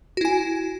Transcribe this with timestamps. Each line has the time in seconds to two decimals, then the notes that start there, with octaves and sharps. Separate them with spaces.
0.17 F#4
0.21 E4
0.25 G#5